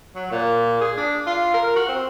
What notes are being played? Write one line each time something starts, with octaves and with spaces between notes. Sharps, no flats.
F#3
A#2
G#4
D4
F4
A#4
F#4
C4